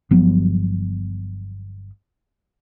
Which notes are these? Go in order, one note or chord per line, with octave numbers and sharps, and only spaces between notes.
G1 F3 F#3 B3